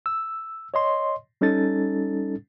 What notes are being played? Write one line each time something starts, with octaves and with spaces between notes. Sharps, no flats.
E6
C#5 D#5 C6
G3 C#4 D#4 A4 A6